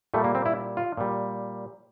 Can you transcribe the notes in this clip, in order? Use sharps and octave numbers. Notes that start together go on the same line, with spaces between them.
A#2 G3 A3
A#3
C4
E4
F4
A#2 G3